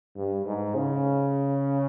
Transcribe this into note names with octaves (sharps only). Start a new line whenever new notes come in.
G2
G#2
C#3